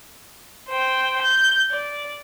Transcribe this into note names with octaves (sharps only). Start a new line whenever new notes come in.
C5 G5
G6
D5